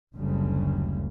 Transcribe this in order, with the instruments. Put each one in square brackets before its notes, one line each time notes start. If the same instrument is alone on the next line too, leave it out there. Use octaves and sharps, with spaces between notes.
[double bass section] F#1 D2 C#3 G3